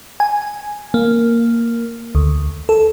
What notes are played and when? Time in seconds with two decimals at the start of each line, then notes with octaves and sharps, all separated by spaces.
0.20 G#5
0.94 A#3
2.15 D2
2.69 A4